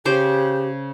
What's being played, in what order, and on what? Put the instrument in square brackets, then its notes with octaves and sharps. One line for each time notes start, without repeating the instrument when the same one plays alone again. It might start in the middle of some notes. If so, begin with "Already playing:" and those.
[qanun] C#3 C5 D6 [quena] G4